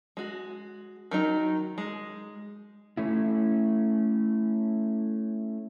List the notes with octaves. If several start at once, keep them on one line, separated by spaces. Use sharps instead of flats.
G#3 F#4
D#3 F#3 D#4
G#3
A3 C#4 E4